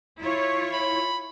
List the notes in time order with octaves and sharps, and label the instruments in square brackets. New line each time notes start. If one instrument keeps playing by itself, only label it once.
[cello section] E4 F4 C#5
[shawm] B5